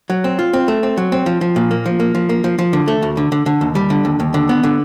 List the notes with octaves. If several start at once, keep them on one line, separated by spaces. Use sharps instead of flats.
F#3
C4
F4
C4
A3
C4
F#3
C4
F3
F3
A#2
A#3
F3
A#3
F3
A#3
F3
F3
D3
A3
D2
D3
D3
D3
D#2
G3
D3
D#2
D#2
D3
B3
D3